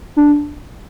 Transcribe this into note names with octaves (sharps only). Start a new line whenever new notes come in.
D4